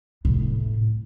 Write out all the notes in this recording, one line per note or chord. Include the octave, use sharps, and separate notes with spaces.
A2 C3